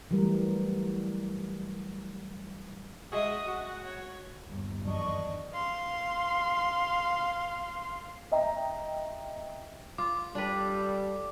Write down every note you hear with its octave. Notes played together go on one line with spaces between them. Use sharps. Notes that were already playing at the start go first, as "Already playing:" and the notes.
E3 F#3 G3 A3 A#4
G#3 F#4 G#4 D#5 E5 D#6
F#4 F#5
C#5
G1 D#2
F#2 D#3 E3 F#3 D4 D#5 C#6
F5 C6
D#5 E5 G5 A#5
F4 D6
G3 D4 A4 B4